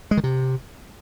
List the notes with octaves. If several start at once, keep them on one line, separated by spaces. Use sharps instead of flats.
G#3
D#3
C3